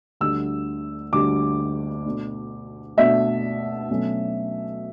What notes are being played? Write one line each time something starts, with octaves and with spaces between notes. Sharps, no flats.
D2 D3 G3 E6
D2 D3 G3 D6
B2 A3 D4
B2 A3 D4 E5
B2 F#3 A3 C#4